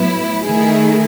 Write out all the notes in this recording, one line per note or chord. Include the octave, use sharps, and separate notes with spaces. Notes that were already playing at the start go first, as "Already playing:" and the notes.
Already playing: A2 F#3 B3 E4
D#3 A3 E4 G#4